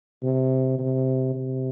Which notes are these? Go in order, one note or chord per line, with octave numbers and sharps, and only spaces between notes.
C3
C3
C3